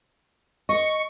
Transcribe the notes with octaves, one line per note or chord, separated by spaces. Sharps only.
D#5 C#6